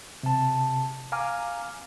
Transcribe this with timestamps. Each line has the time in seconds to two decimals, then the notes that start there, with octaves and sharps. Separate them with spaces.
0.23 C3 A5
1.12 F5 G#5 A#5 D6 F6